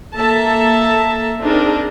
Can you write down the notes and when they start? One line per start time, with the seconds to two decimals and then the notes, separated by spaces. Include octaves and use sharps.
0.14 A#3 A4 E5 A5 A#5
1.40 C4 D4 D#4 G#4 A#4